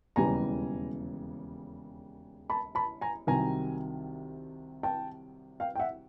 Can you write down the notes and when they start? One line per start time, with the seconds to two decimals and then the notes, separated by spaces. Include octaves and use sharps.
0.16 E1 D#2 C#3 E3 G3 G#5 A#5
2.50 A5 B5
2.75 A5 B5
3.01 G#5 A#5
3.27 C2 C3 D#3 F#3 G#5 A#5
4.83 G5 A5
5.60 F5 G5
5.75 G5
5.79 E5 F#5